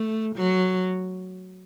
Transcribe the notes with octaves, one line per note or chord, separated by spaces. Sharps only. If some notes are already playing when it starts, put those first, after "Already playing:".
Already playing: A3
F#3